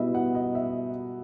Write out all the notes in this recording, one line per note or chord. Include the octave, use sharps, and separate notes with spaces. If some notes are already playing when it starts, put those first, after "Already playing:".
Already playing: B2 G3 B3 E4 D#5 E5
F#5
D#5
E5